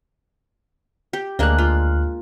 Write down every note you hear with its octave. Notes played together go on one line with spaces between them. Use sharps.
G4
D2 G#3 A#3 D4 F#6
F4